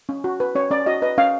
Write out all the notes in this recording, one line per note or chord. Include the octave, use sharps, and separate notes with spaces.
C#4
F#4
B4
C#4 C#5
C#4 D5
F#4 D#5
B4 D#5
C#4 F5